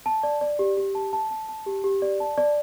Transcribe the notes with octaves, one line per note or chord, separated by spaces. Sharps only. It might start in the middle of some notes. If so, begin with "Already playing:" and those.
A5
D5
D5
G4
G4
A5
A5
A5
A5
G4
G4
D5
A5
D5